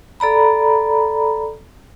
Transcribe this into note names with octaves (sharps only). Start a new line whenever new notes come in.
A4 D5 A#5 B5